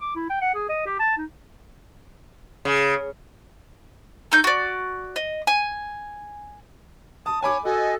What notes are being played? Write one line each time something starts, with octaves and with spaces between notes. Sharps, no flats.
D6
E4
G5
F#5
G#4
D#5
G4
A5
D#4
C#3
A3 D#4 G6
F#4 D5
D#5
G#5
A5 D#6
C#5 G#5 B5 D6
F#4 A4 D#5 G#5